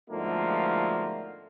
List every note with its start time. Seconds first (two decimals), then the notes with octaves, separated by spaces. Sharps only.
0.10 G#2 B2 D3 F3 A3 A#3